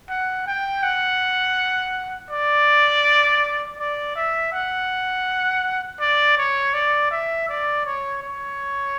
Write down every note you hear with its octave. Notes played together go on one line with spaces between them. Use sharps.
F#5
G5
F#5
D5
D5
E5
F#5
D5
C#5
D5
E5
D5
C#5
C#5